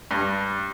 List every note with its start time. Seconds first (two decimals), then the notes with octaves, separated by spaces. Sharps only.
0.11 G2